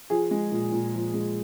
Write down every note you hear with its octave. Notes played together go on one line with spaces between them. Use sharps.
F3 G#4
G#3
A#2
A#2
F3
G#3